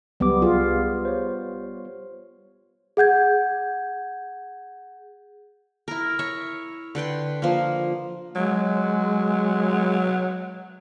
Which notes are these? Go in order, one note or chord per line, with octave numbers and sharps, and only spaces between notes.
C#2 F#3 G3 B3 D6
C2 F4 G#4
C5 C#5
G#4 F#5 G6 G#6
E4 A#4
C#5 E5
D3 B4 G5 C6
F3 A#3
F#3 G#3